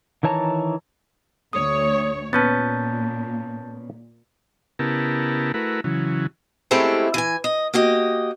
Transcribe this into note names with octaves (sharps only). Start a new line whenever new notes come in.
D#3 E3 C#5 A5 A#5
D2 C#5 D#6
A#2 B3 C#4 B4 A5 G6 A6
C#3 B3 E4 G4 A#4 A5
A3 E4 F#4 A#4 B4
C#3 E3 F#3
G#3 A3 C4 C#4 E4 G4
E3 G#5
D#5
A#3 F#4 G4 D#5